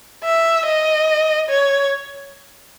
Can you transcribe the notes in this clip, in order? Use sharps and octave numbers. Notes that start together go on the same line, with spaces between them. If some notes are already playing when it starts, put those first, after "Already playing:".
E5
D#5
C#5